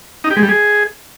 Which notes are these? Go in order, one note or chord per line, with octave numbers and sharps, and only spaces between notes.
D#4
G4
G#3
G3
G#4